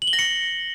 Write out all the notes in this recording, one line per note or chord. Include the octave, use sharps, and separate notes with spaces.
F#7
G7
A#6
C#7